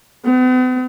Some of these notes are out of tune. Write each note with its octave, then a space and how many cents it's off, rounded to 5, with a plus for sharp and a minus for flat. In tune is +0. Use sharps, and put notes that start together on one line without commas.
B3 +45